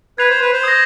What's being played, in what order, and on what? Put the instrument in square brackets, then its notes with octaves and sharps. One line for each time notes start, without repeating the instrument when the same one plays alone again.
[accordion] B4 [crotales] G#6 C7 F7
[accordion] C5
B4
C5
[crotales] D#6 G6 A#6